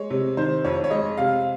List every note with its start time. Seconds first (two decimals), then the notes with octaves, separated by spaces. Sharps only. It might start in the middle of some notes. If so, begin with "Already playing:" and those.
Already playing: G#3 C#5
0.10 C3
0.37 D#3 C5
0.64 F2 C#5
0.84 C#5
0.90 G#3 D#5
1.17 C3 F5